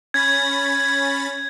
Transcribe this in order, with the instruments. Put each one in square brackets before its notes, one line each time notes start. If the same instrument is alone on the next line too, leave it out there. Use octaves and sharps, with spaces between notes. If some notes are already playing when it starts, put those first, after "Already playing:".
[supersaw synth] C#4 B5 A6 [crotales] G#6